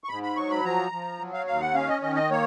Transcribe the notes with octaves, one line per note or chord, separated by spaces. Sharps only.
C#6
G#2 B5
B5
F#3 C#6
B5
F3 A#5
F3
F#3
F5
D#2 F5
F#5
C#4 F5
D#5
D#3 D#5
D#5
A#3 C#5